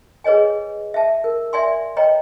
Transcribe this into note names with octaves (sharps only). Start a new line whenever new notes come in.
G#4 B4 C#5 D#5 G#5
E5 A5
A#4
D5 E5 G#5 C6
B4 C#5 D#5 G5 A#5